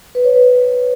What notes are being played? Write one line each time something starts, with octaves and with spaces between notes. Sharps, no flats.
B4
C#5
B4